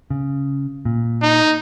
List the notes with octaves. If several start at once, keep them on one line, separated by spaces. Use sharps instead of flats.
C#3
A#2
D#4